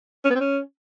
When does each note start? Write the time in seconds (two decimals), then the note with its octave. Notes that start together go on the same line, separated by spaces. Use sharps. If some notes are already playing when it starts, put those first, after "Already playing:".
0.25 C#4
0.30 B3
0.35 C4
0.40 C#4